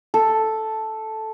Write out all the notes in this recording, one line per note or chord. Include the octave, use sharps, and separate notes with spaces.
A4